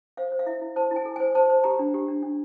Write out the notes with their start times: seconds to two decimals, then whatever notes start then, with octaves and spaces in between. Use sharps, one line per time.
0.17 C5 F5
0.32 C5
0.39 F5
0.46 E4 E5
0.61 E4
0.76 C5 A5
0.91 E4
0.96 G#5
1.05 A4
1.16 C5 G#5
1.35 C5 A5
1.50 C5
1.64 G4 A#5
1.79 D4
1.94 G4
2.08 D4
2.23 D4